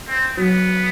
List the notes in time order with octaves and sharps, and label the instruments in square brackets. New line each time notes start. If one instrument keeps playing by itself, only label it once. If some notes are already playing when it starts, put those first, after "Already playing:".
[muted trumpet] C4
[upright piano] F#3 [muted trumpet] B3